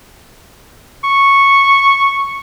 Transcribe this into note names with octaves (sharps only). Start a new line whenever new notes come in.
C#6